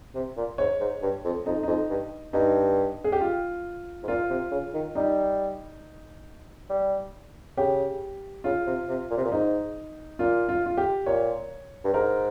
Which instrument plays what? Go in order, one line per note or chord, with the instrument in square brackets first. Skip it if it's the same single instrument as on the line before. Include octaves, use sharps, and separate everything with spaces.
[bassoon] C3
A#2
[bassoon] G#2 [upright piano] C#5
[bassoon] G#2
G2
F2
[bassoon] F2 [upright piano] D#4
[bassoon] F2 [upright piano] D#4
[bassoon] G2
[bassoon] G2 [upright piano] D#4
[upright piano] G#4
G4
F4
[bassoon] G#2
[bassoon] A#2 [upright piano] F4
[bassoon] C3
C#3
D#3
[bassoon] G3 [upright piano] D#4
[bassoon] G3
[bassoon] C#3 [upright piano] G4
[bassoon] C#3 [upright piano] F4
[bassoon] C3
C3
A#2
C3
A#2
[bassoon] G#2 [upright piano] D#4
[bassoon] A#2 [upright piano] F4
[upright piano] F4
F4
G4
[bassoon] A#2 [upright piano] C#5
[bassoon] G2
[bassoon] G#2 [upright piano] A#4